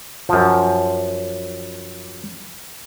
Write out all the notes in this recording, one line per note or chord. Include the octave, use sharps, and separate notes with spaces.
F#2 F3